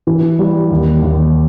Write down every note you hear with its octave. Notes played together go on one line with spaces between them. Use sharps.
E3
G3
D#2
D#2